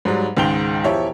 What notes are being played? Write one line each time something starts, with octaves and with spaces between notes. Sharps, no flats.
G#2 F#3 G3
C#2 G#2 D#3 G5 F7 G7
E1 F3 E4 G4 C#5 C#6